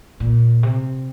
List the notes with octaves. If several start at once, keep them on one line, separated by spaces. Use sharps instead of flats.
A#2
C3